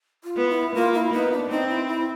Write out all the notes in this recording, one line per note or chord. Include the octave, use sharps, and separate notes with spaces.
F4
B3
E4
A#3 F4
E4
B3 D#4
D4
C4 D#4
E4
E4